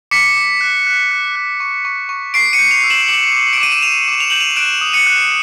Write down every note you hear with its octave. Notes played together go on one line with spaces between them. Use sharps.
D6 B6 C#7
D6
F#6
F#6
F#6
F#6
C#6
C#6
C#6
C#6 C7 D7
C#7 D#7
G6
D#7 F7
E6
E7 F#7
D6 E7 F#7
D6
D6 D7
D#7
E7
D6 D#7 F7
D6
F7
G6 F#7
D#7 F7
F#6 D7 E7
D#6
C#7 D#7
F#6